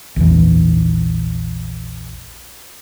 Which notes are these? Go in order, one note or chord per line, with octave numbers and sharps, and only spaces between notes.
A#1 E2 E3